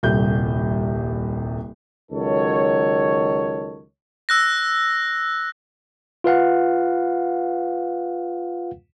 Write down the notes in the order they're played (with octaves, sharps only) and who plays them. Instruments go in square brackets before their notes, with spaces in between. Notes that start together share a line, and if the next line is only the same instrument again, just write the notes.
[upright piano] D#1 C2 A4 G6
[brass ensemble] C#2 D#3 F#3 A4 C#5
[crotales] E6 F#6 A#6
[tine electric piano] F4 B4 F5 F#5